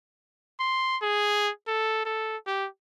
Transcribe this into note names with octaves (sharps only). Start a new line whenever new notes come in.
C6
G#4
A4
A4
G4